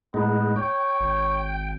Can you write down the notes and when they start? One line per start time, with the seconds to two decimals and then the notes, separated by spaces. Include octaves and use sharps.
0.14 A2 G#3 B3 D#4
0.56 C#5 G5
1.00 G#1